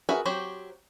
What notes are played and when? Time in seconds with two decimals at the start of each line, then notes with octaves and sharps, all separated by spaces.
0.09 F#4 G#4 A#4 B4 E5
0.25 F#3 C4 F#4 G4